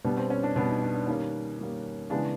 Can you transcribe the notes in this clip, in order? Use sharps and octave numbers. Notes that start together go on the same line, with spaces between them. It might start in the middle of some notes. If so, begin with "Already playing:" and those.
B2 G3 B3 D4
C4
C#4
D4
B2 G3 B3 D4
D#4
D4
D4
D#3 G3 A#3 C#4
D#3 G3 A#3
C#3 E3 G#3 B3 D4